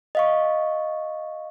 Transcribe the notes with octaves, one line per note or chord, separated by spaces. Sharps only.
D#5 F5 C#6